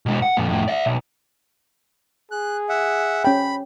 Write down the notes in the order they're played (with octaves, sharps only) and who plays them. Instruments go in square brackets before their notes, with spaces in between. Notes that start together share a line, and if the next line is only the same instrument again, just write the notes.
[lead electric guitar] B2 G#3
F#5
F2 A#2
F2 A2
D5 E5
B1
[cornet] G#4 [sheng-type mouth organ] F#6
[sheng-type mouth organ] E5 F#5
[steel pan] C#4 G5 [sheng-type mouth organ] B5